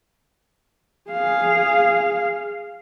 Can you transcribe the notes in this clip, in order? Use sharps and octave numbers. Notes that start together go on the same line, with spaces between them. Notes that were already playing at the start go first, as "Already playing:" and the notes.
G#4 F5